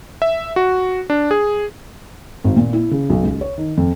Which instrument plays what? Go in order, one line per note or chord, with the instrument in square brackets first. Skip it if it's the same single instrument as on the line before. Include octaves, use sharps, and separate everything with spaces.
[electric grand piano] E5
F#4
D4
G#4
[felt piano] G#1
A#2
E4
C#3
B1
C#2
C#5
D#3
F2